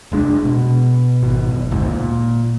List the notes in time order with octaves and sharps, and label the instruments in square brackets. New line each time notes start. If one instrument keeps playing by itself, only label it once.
[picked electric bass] F1 G#3 D4
B2
G#1 B2
F#1
G#1 D2 G#2
A#2